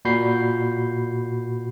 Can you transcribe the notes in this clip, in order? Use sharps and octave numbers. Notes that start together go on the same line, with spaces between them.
A#2 F#4 B5 G6 C7